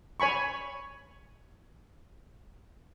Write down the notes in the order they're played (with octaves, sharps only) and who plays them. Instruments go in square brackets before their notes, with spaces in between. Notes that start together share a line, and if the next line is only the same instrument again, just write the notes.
[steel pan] C#5 G#5 B5 C#6